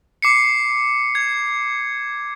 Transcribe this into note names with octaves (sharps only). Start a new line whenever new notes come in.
D6 C7 C#7
G#6